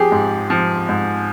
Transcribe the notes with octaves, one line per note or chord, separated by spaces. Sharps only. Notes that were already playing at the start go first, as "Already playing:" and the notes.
Already playing: F3 G4 G#4
G#2
F3
G#2